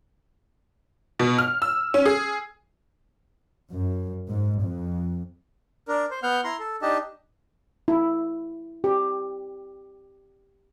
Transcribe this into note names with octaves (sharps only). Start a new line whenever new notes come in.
B2
F6
E6
C#4
G#4
F#2
G#2
F2
D4 A#4
C5
B3 F#5 F6 G6
E4 A#5 C6
A4
D4 D#4 G4 D#5 A5
E4
G4